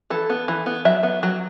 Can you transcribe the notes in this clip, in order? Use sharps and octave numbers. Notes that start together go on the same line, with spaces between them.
E3 A4
B3
E3
B3
F#3 E5
B3
F#3